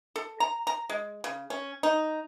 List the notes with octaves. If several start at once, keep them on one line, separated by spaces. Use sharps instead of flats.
A4
A#5
A#5
G#3
C#3
C#4
D#4